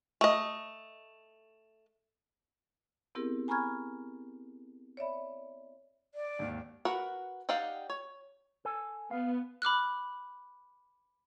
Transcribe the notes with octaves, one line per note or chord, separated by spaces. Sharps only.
A3 D#5
B3 C4 E4 G4 G#4 A#4
G#5 A#5 B5 C#6 F6 G#6
C#5 D5 E5 B5
D5
G#1 D#2
F#4 A#4 B4 F#5
D#4 G4 D5 F5 F#5
C#5
A4 G#5
B3 F5
B5 D6 F6 F#6